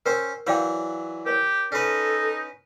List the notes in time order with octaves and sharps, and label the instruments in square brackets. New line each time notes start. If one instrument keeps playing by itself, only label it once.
[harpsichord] C#4 C5 G5 [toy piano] A#4
[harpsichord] E3 F#3 D5 [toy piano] C#5 F5 G5
[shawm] G4 [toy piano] A#4 C#5
[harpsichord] C#4 B4 [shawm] D#4 [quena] A4